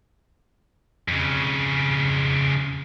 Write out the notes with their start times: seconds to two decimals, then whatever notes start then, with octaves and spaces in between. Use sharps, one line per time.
1.08 F2 C#3